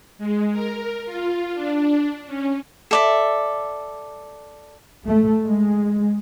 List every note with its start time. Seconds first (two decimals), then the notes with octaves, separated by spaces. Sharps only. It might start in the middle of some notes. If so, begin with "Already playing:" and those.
0.18 G#3
0.52 A#4
1.06 F4
1.54 D4
2.27 C#4
2.91 A4 D5 E5
5.06 A3
5.45 G#3